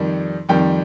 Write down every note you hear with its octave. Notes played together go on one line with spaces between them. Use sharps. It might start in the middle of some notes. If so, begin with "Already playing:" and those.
Already playing: F2 D#3 G3
F2 D#3 G3 G5